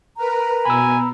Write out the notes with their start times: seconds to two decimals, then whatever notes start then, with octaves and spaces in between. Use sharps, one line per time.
0.17 A#4 B4 A#5
0.65 B2 G#5 B5 E6